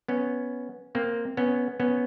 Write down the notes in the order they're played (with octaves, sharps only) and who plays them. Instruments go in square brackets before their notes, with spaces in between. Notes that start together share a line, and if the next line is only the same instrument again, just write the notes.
[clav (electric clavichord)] B3 C#4
A#3 C4
B3 C#4
B3 C#4